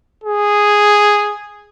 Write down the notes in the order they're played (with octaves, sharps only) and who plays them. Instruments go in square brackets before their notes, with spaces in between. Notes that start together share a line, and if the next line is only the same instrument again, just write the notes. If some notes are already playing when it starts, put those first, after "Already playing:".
[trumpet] G#4